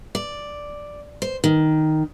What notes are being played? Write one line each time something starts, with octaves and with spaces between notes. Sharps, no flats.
D5
C5
D#3